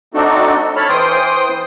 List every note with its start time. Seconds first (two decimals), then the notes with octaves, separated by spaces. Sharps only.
0.14 A3 C4 D4 D#4 F#4 A4
0.76 A4 C#5 A5 B5 F6
0.89 E3 C5 G5 C6 D#6